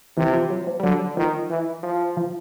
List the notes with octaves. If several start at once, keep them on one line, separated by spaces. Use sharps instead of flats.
C3 E3
F3
F#3
F3
G3
D3 F#3
D#3 F3
E3
F3
F3